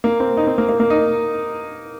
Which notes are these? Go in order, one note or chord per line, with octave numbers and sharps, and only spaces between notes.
A#3
C4
D#4
C4
A#3
A#3
A#3
D#4